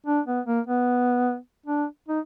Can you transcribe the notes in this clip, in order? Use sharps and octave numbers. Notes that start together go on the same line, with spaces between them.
D4
B3
A#3
B3
D4
D#4